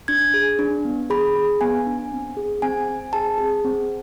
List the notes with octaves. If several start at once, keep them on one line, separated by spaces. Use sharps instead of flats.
D4 G#6
G#4
D4
B3
G#4 B5
G#4
B3 G#5
D4
C4
G#4
C4 G#5
C4
G#4 A5
G#4
C4